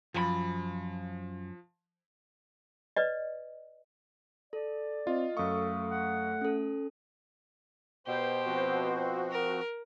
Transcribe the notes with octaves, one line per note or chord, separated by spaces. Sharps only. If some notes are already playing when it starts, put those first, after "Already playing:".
F#2 F3 G#4 B5
B4 D5 D#5
A4 D5
C4 F4 D#5
F#2 A3 A4 F5 C#6 D#6
F#5
C#4 A4
B2 G4 C5
F3 C4 F#4
A#4